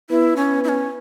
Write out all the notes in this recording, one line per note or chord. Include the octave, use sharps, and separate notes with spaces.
B3 E4 B4
C#4
E4
C#4